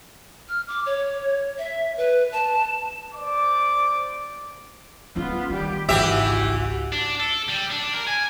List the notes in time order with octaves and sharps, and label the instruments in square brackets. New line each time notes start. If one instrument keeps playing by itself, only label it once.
[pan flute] F6
D6
C#5
E5
B4
A5
[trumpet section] C5 D5 D6
[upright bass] G#3 C#4 [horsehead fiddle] B3 F4
[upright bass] D#3 [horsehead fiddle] G3 G4
[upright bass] G#1 C#2 [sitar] E3 G4 E5 [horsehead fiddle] F#4
[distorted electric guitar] D4
A4
G3
D4
A#4
G#5